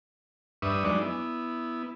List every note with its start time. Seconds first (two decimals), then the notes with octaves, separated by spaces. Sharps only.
0.62 G2 D4 B4 E5 C#6 D#6
0.84 F#3 G#3 D4 D#4 D5
1.02 B3 E4